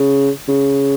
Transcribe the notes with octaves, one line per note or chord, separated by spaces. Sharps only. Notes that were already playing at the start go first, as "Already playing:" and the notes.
Already playing: C#3
C#3